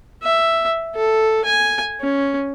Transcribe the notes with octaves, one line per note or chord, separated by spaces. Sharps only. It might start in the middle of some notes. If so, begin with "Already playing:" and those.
E5
A4
G#5
C#4